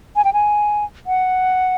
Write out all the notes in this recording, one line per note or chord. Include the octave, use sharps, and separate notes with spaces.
G#5
G5
G#5
F#5